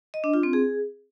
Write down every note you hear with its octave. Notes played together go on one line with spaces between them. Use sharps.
D#5
D4
F4
C4
G#4